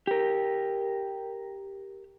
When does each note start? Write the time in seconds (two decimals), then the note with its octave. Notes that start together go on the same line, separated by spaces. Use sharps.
0.07 G4 A#4